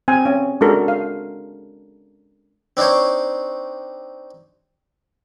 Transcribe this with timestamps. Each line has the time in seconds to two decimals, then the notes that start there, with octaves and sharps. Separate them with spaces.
0.08 C4 G#5
0.25 C#4
0.61 G#3 D4 F#4 A4 A#4
0.88 F5
2.77 C4 D4 D#4 C5 C#5